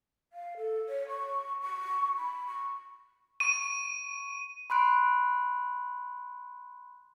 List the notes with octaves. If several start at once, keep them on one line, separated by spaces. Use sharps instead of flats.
F5
A4
C#5
C#6
C#6
B5
C#6
C#6 D#7
B5 C6 F#6 D7